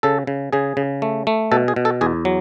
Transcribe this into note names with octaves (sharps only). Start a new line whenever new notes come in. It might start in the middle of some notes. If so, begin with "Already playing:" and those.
C#3 A4
C#3
C#3 G#4
C#3
A3
A3
B2 A4
G#4
B2
A4
E2 G#4
F#3